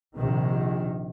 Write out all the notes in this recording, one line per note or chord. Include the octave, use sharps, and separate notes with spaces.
A#1 C3 D#3